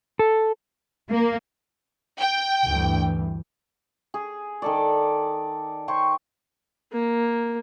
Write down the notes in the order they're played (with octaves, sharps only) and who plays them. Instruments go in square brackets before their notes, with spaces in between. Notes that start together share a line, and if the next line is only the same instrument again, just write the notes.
[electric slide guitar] A4
[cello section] A#3
[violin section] G5
[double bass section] D2 G2 E3
[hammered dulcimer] G#4
D#3 A4 D5
C5 C#5 G5 C#6
[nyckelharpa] A#3